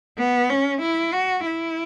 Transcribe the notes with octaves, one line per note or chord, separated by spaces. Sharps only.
B3
C#4
E4
F#4
E4